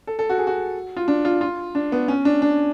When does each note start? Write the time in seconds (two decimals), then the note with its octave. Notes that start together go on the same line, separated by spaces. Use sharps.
0.07 A4
0.19 A4
0.29 F#4
0.38 G#4
0.47 F#4
0.97 F4
1.08 D4
1.25 F4
1.41 F4
1.75 D4
1.92 B3
2.08 C#4
2.25 D4
2.42 D4